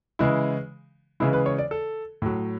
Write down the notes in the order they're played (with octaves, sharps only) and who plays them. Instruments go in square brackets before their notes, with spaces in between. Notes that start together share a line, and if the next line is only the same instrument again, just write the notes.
[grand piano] C#3 E3 G#3 E4
C#3 E3 G#3 E4
B4
C#5
D5
A4
A2 F#3